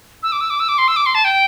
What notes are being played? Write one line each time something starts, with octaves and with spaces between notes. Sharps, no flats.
E6
D6
E6
D6
E6
D6
C6
E6
D6
C6
A5
G5